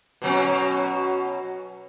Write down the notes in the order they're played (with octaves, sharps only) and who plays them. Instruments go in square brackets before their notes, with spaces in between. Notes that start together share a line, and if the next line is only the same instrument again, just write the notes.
[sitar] B2 F#3 C#4